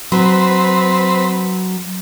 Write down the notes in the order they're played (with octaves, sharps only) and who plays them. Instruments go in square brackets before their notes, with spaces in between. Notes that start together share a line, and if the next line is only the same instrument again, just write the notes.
[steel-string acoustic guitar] F#3 [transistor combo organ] C4 B4